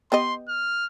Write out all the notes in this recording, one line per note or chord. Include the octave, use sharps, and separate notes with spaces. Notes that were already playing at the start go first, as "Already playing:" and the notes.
B3 G4 D#5 C6
F6